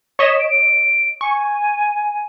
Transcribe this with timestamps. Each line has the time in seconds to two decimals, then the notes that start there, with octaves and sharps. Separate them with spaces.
0.19 C#5 D#5 B6 E7
0.38 D7
1.21 G#5 C#6